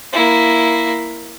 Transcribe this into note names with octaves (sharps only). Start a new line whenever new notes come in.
A#3 E4